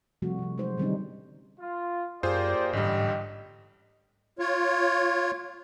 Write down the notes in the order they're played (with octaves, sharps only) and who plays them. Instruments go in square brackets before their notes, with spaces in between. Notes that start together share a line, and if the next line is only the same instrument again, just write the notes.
[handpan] C3 F3 G3 A3 F#4
C3 F3
F#3 G#3 D#4 C5
D3 D#3 G3 C4 C#4 D#4
[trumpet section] F4
[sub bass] F#2 [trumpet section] A#3 G4 D5 [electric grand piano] F4 G#4 C5
[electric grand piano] A1 D3 G3 [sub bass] G#2 [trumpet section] G4 D#5
[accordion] F4 C#5